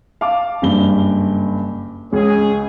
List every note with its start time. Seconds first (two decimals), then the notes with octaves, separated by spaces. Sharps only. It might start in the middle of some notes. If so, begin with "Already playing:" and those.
0.21 F5 A5 D6
0.62 F#1 G2 G7
2.13 C#2 C#4 G#4